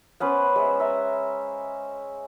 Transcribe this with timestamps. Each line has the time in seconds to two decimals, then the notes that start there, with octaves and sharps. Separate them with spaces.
0.20 B3 C#4 B4 C5
0.56 G#3 E5
0.80 E5 A#5